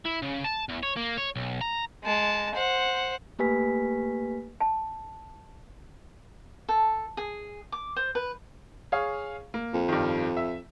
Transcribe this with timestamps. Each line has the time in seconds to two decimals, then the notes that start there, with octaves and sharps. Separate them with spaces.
0.05 E4
0.22 C#3
0.44 A5
0.69 E2
0.83 C#5
0.97 A#3
1.17 C#5
1.36 B1
1.61 A#5
2.04 G#3 A5
2.55 C5 F#5
3.39 A3 A#3 G4 B4 G#5 B6
4.60 A5
6.69 A4
7.17 G#4
7.72 D6
7.96 C5
8.15 B4
8.92 G#4 C#5 F5
9.54 A#3
9.74 F2
9.89 G2 D#3
10.37 E5